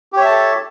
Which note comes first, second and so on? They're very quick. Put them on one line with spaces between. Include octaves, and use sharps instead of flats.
G4 C#5 E5 A5 A4